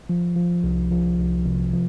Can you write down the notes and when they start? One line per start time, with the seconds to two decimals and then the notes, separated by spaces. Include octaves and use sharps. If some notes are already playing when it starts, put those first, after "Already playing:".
0.09 F3
0.36 F3
0.64 C2
0.91 F3
1.19 C2
1.45 C3
1.73 F3